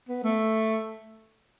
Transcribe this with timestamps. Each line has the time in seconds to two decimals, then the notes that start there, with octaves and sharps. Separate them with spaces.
0.09 B3
0.24 A3